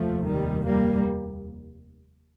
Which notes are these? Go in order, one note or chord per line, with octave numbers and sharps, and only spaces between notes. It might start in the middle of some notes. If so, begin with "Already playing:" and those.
Already playing: F1 D#2 F3 A3
D#3 G3
G3 A#3